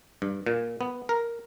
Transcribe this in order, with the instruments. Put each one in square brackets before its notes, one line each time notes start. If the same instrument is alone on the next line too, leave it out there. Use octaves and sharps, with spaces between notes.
[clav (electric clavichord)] G2
A#2
B3
A#4